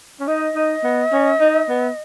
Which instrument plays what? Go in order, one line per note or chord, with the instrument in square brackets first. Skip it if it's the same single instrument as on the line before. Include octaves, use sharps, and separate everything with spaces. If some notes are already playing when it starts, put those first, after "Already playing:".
[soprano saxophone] C#4
[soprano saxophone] D#4 [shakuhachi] D#5
[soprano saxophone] D#4
B3
C#4
D#4
B3